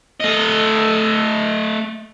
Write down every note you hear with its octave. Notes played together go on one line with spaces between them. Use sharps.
A3 D#5